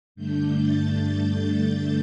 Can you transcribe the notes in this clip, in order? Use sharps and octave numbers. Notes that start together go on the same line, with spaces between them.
G2 D3 A3 D4 G6
A6